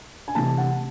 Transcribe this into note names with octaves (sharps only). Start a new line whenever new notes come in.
G#5
C3 E3 A3 A5
F#5